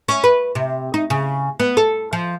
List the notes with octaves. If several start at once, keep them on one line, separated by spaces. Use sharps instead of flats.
C#4
B4
C3
D#4
C#3
B3
A4
F3